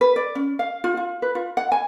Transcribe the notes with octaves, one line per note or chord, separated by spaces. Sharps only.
B4
D5
C#4
F5
F4
F4
B4
F4
F#5
G#5